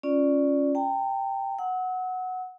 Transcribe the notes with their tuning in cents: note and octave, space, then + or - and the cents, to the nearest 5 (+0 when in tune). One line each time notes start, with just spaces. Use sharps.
C#4 +0 F4 +0 D5 +0
G5 +5 A#5 -40
F#5 +0 E6 -40